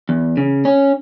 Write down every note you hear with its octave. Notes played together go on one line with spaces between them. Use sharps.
E2
C#3
C#4